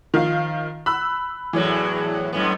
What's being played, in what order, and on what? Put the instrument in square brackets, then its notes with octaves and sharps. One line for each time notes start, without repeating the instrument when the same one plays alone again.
[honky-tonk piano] D#3 F3 F5
B5 E6 F#6
[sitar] E2 A2 F#3 [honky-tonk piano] E3
[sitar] F#2 A2 B3